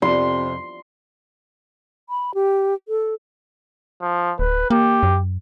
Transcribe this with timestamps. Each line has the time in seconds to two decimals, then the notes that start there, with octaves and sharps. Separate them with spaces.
0.02 F2 C3 C6
2.09 B5
2.34 G4
2.88 A4
4.01 F3
4.39 D1 B4
4.70 A#3 G4
5.03 F#2